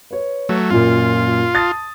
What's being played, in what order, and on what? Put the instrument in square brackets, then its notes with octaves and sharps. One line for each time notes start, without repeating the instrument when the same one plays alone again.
[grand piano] B4 C#5
[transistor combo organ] F#3 A3
[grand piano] F#2 A#2 [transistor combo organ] F4
[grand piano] A5 D#6 A6